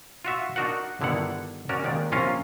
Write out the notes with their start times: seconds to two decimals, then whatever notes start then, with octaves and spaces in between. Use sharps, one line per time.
0.25 F4 F#4 E5
0.56 D4 D#4 F#4 A#4 F#5
1.01 G1 D3 D#3 E4 F#5
1.69 C#4 F#4 A#4 D5
1.84 D#2 D#3 G#3 D5
2.12 A#1 C3 C#4 F4 F5 A#5